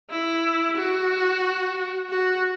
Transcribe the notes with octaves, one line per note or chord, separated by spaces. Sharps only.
E4
F#4
F#4